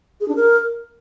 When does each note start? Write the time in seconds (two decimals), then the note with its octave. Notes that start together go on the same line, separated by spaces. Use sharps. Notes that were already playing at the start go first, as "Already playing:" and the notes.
0.21 G#4
0.28 D4
0.36 A#4